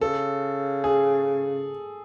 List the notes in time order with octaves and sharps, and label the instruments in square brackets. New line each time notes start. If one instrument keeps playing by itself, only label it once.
[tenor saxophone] C#3 [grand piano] A4
[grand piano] G#4